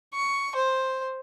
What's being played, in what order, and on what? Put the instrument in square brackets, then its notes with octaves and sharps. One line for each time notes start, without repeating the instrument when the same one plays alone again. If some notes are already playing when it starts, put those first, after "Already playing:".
[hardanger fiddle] C#6
C5